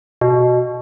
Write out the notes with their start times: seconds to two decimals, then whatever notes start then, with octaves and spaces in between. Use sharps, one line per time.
0.21 B2